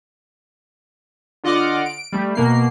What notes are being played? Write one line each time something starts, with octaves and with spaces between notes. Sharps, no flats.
D3 F4 D#5 F#5 D6 F6
D7
G3 A3
B2 A#3 C7